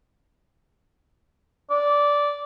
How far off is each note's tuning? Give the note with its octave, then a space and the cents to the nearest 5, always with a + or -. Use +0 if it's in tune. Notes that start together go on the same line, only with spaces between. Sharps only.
D5 -10